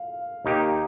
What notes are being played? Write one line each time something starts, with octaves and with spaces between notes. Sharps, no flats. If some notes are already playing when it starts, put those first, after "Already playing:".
Already playing: F5
D#2 D#3 A#3 D#4 G4